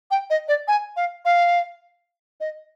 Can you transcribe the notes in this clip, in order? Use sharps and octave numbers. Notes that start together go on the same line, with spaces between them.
G5
D#5
D5
G#5
F5
F5
D#5